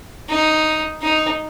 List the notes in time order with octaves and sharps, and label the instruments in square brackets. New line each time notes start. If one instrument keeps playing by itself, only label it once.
[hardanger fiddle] D#4
D#4